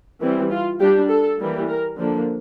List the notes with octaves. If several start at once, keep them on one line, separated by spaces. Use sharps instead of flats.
E3 G3 C4
F4
G3 D4 G4
A4
E3 G3 A#3
A#4
D3 F3 A#3 D4